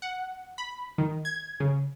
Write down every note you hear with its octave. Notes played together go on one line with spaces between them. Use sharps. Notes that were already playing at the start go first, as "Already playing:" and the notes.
F#5
B5
D#3
G#6
C#3